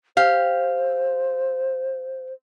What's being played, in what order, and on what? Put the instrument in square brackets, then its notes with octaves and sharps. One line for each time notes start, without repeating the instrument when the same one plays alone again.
[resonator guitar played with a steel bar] G4 F5 [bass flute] C5